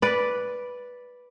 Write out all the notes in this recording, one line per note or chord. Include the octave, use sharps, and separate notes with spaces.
B4 D5